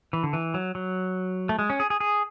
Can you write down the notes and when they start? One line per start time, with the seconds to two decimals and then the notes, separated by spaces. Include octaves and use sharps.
0.13 E3
0.23 D3
0.33 E3
0.54 F#3
0.75 F#3
1.49 A3
1.59 G#3
1.70 C#4
1.80 G#4
1.90 G#4
2.00 G#4